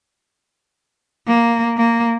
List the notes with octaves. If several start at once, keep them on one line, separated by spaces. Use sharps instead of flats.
A#3
A#3